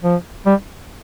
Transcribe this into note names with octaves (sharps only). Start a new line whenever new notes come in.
F3
G3